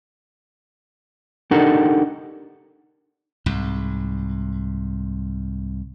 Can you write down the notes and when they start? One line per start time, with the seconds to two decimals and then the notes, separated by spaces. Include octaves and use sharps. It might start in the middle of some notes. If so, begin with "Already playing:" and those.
1.51 D4 D#4 G4 A4 A#4 F#5
3.46 C2 G#2